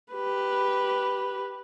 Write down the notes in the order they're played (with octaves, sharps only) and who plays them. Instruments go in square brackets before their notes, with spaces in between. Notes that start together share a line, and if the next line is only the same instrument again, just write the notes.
[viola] G4 B4